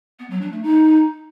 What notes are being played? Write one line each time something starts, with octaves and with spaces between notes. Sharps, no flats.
B3
F#3
D4
A3
D#4